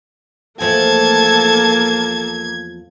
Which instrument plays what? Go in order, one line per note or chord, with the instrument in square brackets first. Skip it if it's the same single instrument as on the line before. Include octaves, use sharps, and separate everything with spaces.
[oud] E2 F3 A3 [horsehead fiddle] A#3 [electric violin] A4 A5 [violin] G#6